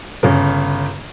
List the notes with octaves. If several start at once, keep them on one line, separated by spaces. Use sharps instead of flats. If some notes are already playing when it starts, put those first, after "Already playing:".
G1 C#3